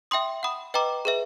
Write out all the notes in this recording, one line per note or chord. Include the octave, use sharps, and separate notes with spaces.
E5 G5 C6 D#6
F#5 B5 D#6
B4 D#5 G5 A#5 D6
G#4 B4 E5